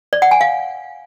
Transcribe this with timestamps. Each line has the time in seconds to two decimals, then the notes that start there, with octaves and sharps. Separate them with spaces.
0.13 D5
0.22 F#5
0.31 G#5
0.41 F5